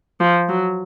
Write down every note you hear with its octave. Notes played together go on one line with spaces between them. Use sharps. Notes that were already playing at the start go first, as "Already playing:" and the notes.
F3
F#3